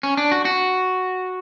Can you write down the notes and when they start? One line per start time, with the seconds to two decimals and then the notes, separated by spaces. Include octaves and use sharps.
0.03 C#4
0.17 D4
0.32 F#4
0.45 F#4